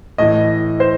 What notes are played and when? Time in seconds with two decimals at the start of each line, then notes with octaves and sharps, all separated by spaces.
0.18 A2 E3 D#5
0.80 C5